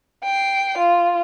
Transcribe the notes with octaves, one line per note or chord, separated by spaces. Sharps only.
G5 C7
F4